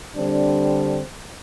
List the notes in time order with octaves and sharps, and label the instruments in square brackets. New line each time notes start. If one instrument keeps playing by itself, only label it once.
[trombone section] D3 G3 C4 D4